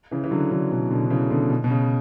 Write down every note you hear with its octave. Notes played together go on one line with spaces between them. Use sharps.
C#3 E3
E3
D3 F#3
D3 F#3
B2 D3
B2 D3
D3
C#3 E3
B2 D3
B2
B2
C#3